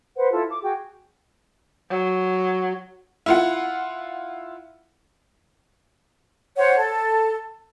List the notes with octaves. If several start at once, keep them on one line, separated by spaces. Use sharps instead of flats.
B4 C5 F#5
E4 F4 A4
D6
F#4 G#4 G5
F#3
E4 F4 F#5
C5 C#5 F#5
A4